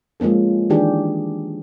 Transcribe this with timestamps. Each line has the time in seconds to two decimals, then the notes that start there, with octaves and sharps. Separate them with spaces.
0.20 F3 G#3 A#3 C#4 A4
0.70 D#3 E3 D4 G4 G#4